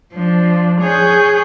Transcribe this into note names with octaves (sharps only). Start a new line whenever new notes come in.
F3 D4
G#4 C#5 F#6 G6